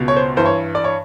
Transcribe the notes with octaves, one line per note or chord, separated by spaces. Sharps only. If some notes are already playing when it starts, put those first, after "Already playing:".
Already playing: C#2 B2
C#5
C5
G2 E3 C5
C#5
D5
C#5